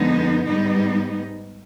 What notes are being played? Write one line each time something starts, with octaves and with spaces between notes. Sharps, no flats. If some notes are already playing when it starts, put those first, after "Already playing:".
Already playing: F2 D3 G#3 B3 D#4
G#2 G3 B3 D#4